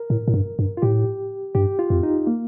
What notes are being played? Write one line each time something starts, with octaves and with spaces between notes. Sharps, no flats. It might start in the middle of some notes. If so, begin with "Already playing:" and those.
Already playing: A#4
A2
A2
G2
G2
F4
A2 G4
G2 G4
F4
F2
D#4
A#3